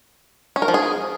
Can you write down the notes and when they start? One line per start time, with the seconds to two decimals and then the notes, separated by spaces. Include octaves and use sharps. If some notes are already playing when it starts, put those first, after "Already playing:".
0.56 C#4
0.62 A#4
0.68 F3
0.74 G#4